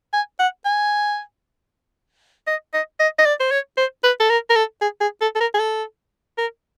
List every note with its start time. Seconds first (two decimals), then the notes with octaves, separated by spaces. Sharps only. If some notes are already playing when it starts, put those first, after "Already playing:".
0.13 G#5
0.39 F#5
0.65 G#5
2.47 D#5
2.73 D#5
2.99 D#5
3.18 D#5
3.25 D5
3.40 C5
3.51 C#5
3.77 C5
4.03 B4
4.20 A4
4.29 A#4
4.50 A#4
4.55 A4
4.81 G#4
5.01 G#4
5.21 A4
5.35 A4
5.40 A#4
5.54 G#4
5.59 A4
6.38 A#4